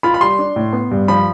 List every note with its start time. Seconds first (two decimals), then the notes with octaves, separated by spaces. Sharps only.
0.03 F4 B5
0.14 B5
0.21 G3 C6
0.39 D4
0.56 A2
0.73 B3
0.91 G2
1.08 F3 B5